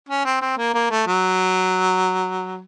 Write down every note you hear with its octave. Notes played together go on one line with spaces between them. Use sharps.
C#4
C4
C4
A#3
A#3
A3
F#3